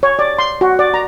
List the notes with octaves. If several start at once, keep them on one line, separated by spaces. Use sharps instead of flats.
C#5
D5
C6
F#4
D5
A#5